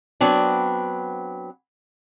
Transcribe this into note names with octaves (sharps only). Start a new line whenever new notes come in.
F#3 B3 C4 D4